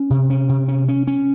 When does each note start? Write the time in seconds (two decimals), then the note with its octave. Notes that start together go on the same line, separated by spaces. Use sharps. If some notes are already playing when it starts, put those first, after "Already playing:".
Already playing: C#4
0.10 C3
0.30 C#4
0.49 C3
0.68 C#4
0.88 C#4
1.07 C#4